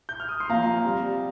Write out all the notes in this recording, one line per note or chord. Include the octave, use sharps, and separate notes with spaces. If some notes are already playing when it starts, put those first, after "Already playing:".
G6
F6
D#6
C6
A#2 F3 F5 A#5
C3 G3